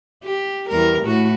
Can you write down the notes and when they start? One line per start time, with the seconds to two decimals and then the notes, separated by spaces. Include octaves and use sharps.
0.24 G4
0.69 E2 G3 A#4
1.02 A2 A3 F#4